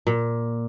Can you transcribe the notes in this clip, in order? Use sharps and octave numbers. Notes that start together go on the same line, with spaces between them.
A#2